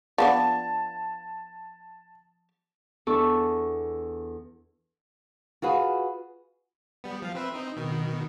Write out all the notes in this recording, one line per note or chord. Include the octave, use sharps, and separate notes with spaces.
F3 B3 D4 A5
E2 D4 A4 A5 C#6
F4 F#4 G#4 B4
G3 B3
F3 F5
C4 B4 E5
C4 D#4
B2 D#3